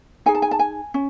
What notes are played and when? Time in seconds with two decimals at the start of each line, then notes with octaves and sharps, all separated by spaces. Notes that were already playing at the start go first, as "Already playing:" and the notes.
0.26 D#4 G#4 G#5
0.35 A5
0.42 G#5
0.51 A5
0.59 G#5
0.94 C#4